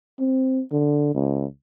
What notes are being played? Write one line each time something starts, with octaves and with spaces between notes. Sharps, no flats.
C4
D3
C#2